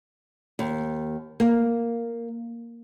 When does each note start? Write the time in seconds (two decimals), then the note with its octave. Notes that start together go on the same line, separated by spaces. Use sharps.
0.59 D#2
1.40 A#3